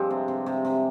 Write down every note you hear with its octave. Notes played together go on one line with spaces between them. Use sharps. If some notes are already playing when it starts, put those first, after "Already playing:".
Already playing: G2 F3 G#3 C4
C3
C3
C3
C3